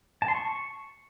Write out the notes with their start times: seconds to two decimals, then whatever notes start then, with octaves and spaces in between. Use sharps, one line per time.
0.22 A5
0.28 C6
0.35 C#6